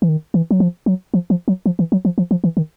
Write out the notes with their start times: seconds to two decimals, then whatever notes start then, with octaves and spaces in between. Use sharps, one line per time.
0.02 E3
0.09 D#3
0.34 E3
0.51 F#3
0.60 F3
0.86 F#3
1.14 F3
1.30 F3
1.48 F#3
1.66 F3
1.79 E3
1.92 F#3
2.05 F3
2.18 F3
2.31 F3
2.44 E3
2.57 D#3